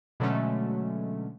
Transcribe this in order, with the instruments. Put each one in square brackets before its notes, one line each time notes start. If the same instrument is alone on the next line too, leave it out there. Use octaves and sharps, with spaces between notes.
[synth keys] B2 D3 F#3 G#3 A3 C#4